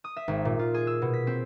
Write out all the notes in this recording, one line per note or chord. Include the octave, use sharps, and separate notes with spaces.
D#6
E5
G#1
A#2
F4
G#4
E6
B2
B6
C4